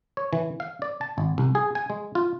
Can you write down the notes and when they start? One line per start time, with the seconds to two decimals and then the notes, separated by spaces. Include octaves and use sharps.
0.17 C#5
0.33 E3
0.60 F5
0.82 D5
1.01 A5
1.18 G#1
1.38 C2
1.55 G#4
1.75 G#5
1.90 G#3
2.15 F4